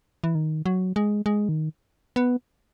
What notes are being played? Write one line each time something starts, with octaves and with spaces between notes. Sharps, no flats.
E3
D#3
F#3
G#3
G#3
D#3
B3